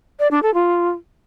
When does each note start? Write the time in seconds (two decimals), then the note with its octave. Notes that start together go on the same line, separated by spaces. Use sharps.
0.19 D5
0.31 D4
0.43 A4
0.54 F4